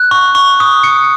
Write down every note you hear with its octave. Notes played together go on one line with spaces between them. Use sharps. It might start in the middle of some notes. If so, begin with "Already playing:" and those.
Already playing: F#6
C#6
C#6
D#6
C#7